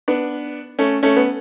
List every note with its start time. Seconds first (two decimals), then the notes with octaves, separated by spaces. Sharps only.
0.08 B3 D4
0.79 A3 C#4
1.03 A3 C#4
1.17 B3